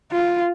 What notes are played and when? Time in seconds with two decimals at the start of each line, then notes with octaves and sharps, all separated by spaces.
0.12 F4